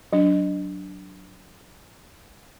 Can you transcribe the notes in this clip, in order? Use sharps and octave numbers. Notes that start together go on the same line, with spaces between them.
F#3 D4